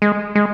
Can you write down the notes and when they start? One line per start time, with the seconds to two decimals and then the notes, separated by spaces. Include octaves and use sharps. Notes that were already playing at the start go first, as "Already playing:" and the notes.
0.02 G#3
0.35 G#3